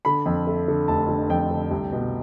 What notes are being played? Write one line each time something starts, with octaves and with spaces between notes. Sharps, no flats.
D3 B5
F2
A3
D3
F1 A5
D3
F2 G5
D3
C2
B2